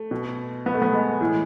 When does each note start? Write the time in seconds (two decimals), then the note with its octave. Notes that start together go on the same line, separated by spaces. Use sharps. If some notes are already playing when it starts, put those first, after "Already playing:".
Already playing: A3
0.11 B2
0.66 B3
0.74 A3
0.82 B3
0.93 G#3
1.21 A2 E3